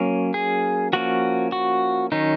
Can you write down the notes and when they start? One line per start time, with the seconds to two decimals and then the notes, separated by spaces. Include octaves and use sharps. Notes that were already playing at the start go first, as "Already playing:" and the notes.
Already playing: F#3 A#3 C#4
0.34 G#4
0.93 F3 A#3 C#4 F#4
1.52 F#4
2.12 D#3 F#3 C#4 D#4